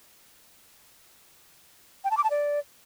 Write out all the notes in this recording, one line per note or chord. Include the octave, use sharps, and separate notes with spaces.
G5
A5
D6
A5
D5